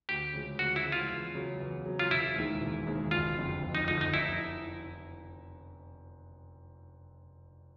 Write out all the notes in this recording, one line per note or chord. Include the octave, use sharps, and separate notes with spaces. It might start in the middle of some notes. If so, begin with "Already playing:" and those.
D2 G4
C#3 F3 G#3
D2 F#4
E4
C#3 F3 G#3
F4
E2
C#3 F#3
E2
C#3 F#3
F4
E1 E4
D#2 D#3 G#3
E1
D#2 D#3 G#3
F#1 F4
F2 D3 F3
F#1
D#4
F2 D3 F3 D#4
D#4
F1 E4